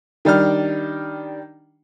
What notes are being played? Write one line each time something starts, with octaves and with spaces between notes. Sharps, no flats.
D#3 G3 D4 F6